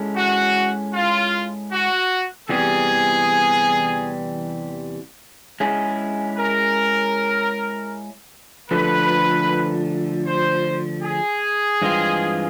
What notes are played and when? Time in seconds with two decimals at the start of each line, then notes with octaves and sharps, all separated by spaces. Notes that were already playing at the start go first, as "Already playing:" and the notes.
Already playing: G#3 C#4 E4 A4
0.17 F#4
0.94 F4
1.72 F#4
2.49 E2 C3 E3 G3 G#4
5.60 G#3 C#4 E4 G#4
6.38 A#4
8.70 D3 F3 A3 B4
10.26 C5
11.03 G#4
11.82 G2 E3 G#3 C4 F4